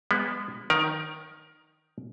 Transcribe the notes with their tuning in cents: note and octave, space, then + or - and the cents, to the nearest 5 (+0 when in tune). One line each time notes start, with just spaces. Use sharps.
G#3 -30 B3 +0
D#3 +0 A#4 +25